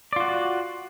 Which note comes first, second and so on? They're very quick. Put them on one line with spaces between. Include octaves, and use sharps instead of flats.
D5 F4 F#4